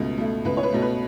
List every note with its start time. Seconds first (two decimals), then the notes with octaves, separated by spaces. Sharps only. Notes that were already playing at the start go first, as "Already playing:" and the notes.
Already playing: C#2 B2 A3
0.18 B2 A3
0.45 C#2 B4
0.57 C#5
0.63 B4
0.73 B2 A3
0.82 B4